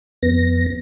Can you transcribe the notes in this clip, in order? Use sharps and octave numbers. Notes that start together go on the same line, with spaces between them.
F2 B3 A#6